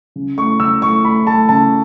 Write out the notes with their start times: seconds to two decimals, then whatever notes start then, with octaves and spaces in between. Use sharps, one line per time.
0.16 C#3
0.37 A3 C#6
0.60 C#3 E6
0.82 A3 C#6
1.04 A3 B5
1.27 A3 A5
1.49 C#3 A5